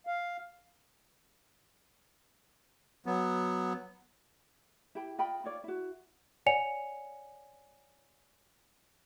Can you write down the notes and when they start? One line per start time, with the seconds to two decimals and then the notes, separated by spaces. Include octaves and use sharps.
0.07 F5
3.06 F#3 B3
4.95 E4 G4 G5 B5
5.19 F4 D#5 G5 B5
5.44 D#4 F4 C#5 D5
5.64 E4 F#4
6.46 C#5 D5 F#5 G#5 C#7 F7